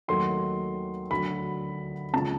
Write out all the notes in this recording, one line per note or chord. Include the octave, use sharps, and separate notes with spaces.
D#2 D#3 F#3 A3 C6
D2 D3 F#3 B5
C#2 C#3 F3 A5